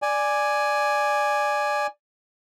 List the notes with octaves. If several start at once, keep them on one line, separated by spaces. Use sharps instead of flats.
D5 G#5